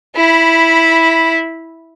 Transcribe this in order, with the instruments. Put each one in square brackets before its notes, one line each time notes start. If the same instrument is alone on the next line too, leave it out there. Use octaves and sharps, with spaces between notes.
[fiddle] E4 B5